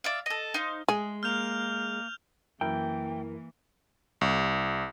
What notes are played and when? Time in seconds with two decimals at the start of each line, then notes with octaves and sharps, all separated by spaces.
0.04 D5 E5 F5
0.26 A4 D#5
0.54 D#4 C5 F5
0.88 G#3 G#4
1.23 A#3 F6 G6 F7
2.61 F#2 E3 A#3 E4 A#4 G5
4.21 C2